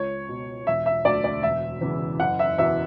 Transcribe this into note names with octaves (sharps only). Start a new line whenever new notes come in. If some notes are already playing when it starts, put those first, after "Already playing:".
Already playing: C#2 C#5
B2
E1 E5
E5
D2 D3 D5
D5
E1 E5
E2 C#3 E3
F#1 F#5
E5
E2 B2 E5